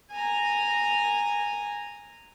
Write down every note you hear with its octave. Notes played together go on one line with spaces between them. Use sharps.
G#5 A#5